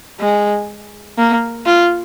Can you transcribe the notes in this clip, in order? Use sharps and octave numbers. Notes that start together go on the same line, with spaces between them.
G#3
A#3
F4